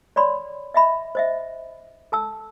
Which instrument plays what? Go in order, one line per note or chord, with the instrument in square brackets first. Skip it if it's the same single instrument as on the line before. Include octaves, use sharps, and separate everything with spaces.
[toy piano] C#5 D5 B5 C6
D#5 E5 B5
C5 D#5 E5
A4 A5 E6